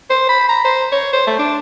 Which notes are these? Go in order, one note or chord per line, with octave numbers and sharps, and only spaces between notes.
C5
B5
A#5
C5
C#5
C5
A3
D4